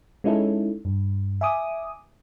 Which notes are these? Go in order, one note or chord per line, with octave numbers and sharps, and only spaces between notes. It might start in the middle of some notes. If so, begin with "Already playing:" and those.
G#3 C#4 D#4 E4 A4
G2
E5 G#5 D6 D#6